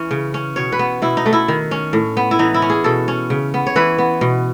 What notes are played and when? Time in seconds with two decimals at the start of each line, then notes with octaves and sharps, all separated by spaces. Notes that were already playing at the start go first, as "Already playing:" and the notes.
Already playing: E3 C#4
0.11 C#3
0.34 C#4
0.56 B2 C#5
0.72 B4
0.79 B3
1.02 B2 E4
1.17 D#4
1.26 A3
1.33 E4
1.48 D#3
1.71 C#4
1.93 A2
2.17 B3
2.31 E4
2.39 E3 D#4
2.54 E4
2.62 C#4
2.70 G#4
2.84 B2 A4
3.08 C#4
3.30 C#3
3.54 B3
3.67 C#5
3.76 E3 B4
3.98 B3
4.21 B2